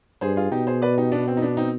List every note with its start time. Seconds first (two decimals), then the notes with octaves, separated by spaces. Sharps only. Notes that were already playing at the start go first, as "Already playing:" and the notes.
0.21 G2 G#4 C5
0.36 F4 G#4
0.52 B2 D#4 G4
0.67 G#4 C5
0.82 B4 D5
0.98 D#4 G4
1.12 B3 D4
1.28 C4
1.37 D#4
1.42 B3 D4
1.57 C4 D#4